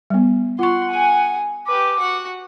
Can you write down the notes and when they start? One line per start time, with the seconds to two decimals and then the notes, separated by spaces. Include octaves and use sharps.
0.10 G3 B3
0.59 F4 F#5 C6 C#6
0.89 G#4 G#5
1.66 G4 B4 D6
1.99 F#4 F#5